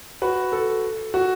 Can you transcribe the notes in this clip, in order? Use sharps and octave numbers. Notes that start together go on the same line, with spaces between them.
F#4 B4
A4
F#4